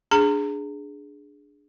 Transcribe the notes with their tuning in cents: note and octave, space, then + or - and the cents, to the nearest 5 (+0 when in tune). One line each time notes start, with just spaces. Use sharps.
D4 +0 G#4 +0 A#5 -30